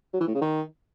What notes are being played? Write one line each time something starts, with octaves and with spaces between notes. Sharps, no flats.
F#3
E3
A2
C#3
D#3